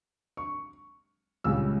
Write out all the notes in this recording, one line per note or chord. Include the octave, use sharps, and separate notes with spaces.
C#6
C#2 C#3 G3 E6